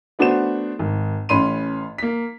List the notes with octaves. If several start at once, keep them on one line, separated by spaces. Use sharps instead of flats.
A3 B3 D4 F#4 C5 E7
G#1
A1 C#4 B5 C6 D#7
A#3 B6